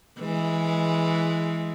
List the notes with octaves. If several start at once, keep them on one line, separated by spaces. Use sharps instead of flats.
E3 G#3